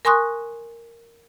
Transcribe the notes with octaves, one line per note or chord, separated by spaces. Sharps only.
A#4 G#5 C6 C#6 D#6 F#6